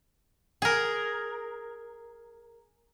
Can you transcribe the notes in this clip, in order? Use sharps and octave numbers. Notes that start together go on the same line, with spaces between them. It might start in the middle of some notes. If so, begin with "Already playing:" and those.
G#4 A#4